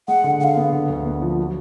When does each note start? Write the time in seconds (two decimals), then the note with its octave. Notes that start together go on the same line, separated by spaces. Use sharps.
0.08 G#3 F#5
0.24 D3
0.40 D3 F5 F#5
0.57 B3
0.73 D3
0.89 D2
1.05 B3
1.22 F3
1.38 F#3